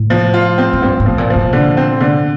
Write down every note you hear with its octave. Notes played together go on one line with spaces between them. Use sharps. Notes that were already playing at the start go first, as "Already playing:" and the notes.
Already playing: A2
F3
F4
C4
A2
G2 C4
A2
F3
A#2
F3
A#2
D3
C4
D3